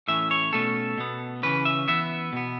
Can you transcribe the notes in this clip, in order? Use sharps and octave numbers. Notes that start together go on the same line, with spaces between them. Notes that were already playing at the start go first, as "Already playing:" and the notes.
A2 E3 C#4 E5
C#5
B2 A3 C#4 A4
B2 B3
C#3 E3 C#4 B4
E5
E3 B3 E5
B2 B3